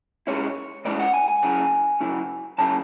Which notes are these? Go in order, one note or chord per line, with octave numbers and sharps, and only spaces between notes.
B2 G#3 C#4 E4 C#5
B2 G#3 C#4 E4 D5
F#5
G#5
G#5
C#3 F#3 C#4 E4
C#3 F#3 C#4 E4
C#3 F#3 C#4 E4 A5